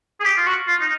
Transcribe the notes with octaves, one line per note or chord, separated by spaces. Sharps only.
G#4
G4
F4
F#4
F4
D#4